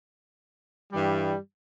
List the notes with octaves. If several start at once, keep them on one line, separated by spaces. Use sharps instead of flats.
G2 E3 G3